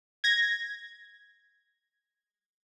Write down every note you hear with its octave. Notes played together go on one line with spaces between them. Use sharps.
G#6 A#6